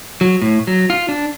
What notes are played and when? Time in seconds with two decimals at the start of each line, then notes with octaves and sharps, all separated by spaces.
0.21 F#3
0.42 A2
0.67 F#3
0.90 F4
1.09 D4